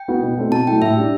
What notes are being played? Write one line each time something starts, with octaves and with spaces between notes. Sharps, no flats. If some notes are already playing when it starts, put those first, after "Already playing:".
Already playing: G5
B3 F#4
B2
A3 C4
B2 A5
F#3 A3 E4 G5
A2 E5
G3 D4